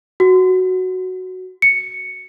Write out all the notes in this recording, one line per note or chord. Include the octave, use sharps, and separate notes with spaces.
F#4
C#7